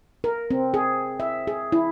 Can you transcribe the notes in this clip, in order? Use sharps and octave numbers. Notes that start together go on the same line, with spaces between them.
A#4
C4
G#4
E5
G#4
E4